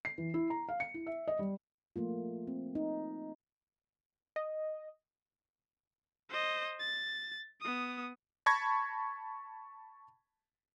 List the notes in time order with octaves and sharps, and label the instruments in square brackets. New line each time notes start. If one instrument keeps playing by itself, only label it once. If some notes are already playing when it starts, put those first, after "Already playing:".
[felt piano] C7
E3
E4
A#5
F5
C#7
E4
E5
D#5
G3
[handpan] F3 A3 A#3 F4
C4
D#4
[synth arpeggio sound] D#5
[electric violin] C5 D#5
A6
B3 D#6
[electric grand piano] A5 B5 C#6 G#6 A#6